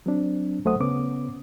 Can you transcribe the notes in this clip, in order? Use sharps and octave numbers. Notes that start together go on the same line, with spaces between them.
F#3 C4 D4
D2 F#3 A3 C5 F#5 D#6
C#3 B3 C#4 D6